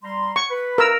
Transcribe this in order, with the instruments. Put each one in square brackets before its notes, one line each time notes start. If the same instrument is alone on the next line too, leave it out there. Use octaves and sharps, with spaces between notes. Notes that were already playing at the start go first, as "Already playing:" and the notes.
[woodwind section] G3 A#5 C6
[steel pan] C#6
[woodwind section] B4 B5
[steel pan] A#4 E6